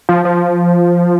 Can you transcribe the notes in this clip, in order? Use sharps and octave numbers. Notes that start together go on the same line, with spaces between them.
F3
F3